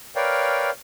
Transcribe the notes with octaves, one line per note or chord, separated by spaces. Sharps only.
A#4 B4 C#5 D5 F5 G5